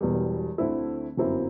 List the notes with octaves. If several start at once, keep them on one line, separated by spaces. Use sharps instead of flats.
E1 E2 B2 G3
D2 D3 A3 C4 E4
G1 F#2 F#3 C4 E4